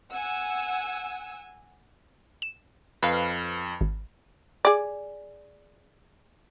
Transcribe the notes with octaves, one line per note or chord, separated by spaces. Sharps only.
F#5 G#5 E6
E7
F2 B4 F5
G#1
G#4 D5